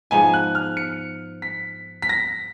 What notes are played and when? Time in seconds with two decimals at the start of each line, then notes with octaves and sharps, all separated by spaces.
0.11 G#2 F3 B3 D#4 G#5
0.34 F#6
0.55 F6
0.77 C#7
1.42 B6
2.02 B6
2.09 A#6